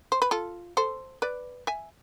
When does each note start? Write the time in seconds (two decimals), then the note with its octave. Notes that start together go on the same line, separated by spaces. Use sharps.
0.12 C5
0.22 B4
0.31 F4 A4
0.77 A4 C5
1.22 B4 D5
1.67 E5 G#5